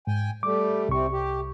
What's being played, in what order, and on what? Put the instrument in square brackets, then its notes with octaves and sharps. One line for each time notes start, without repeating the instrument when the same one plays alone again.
[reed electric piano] G#2 [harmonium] G5 G#5
[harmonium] G3 A3 [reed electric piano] D6
[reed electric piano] C2 C#6 [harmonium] C3 C4
[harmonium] G4